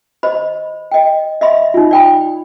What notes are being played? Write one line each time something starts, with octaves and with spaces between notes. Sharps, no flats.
C5 D#5 B5
D#5 G5
D#5 E5 B5 C6
D#4 F4
D5 G5 B5